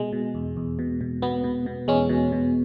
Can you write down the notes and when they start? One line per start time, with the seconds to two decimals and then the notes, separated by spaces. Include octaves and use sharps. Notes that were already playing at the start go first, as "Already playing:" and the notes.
Already playing: B2 G#3
0.12 B2
0.35 E2
0.57 E2
0.79 B2
1.01 B2
1.22 B2 B3
1.44 B2
1.66 B2
1.88 E2 G#3 C#4
2.09 B2
2.32 B2